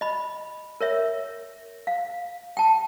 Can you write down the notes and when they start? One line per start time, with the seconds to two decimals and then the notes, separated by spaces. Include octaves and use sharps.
0.01 D#5 B5
0.81 A#4 C#5 E5
1.87 F5
2.57 G5 A5